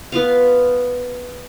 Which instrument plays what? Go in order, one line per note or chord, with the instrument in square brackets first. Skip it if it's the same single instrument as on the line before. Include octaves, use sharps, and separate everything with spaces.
[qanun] B3 F4 F5